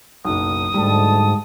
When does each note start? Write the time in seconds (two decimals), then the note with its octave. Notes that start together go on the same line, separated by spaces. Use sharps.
0.25 F#1 B1 D#6
0.74 D2 G#2 G3 G4 A5